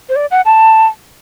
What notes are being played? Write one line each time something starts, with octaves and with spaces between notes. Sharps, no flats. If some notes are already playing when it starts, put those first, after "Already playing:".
C5
D5
F#5
A5